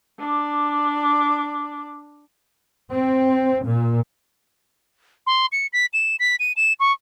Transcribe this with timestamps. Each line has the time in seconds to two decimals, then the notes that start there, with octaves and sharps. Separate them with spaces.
0.19 D4 D6
2.90 C4
3.65 A#2
5.27 C6
5.52 C#7
5.73 B6
5.93 E7
6.20 B6
6.40 D#7
6.56 E7
6.80 C#6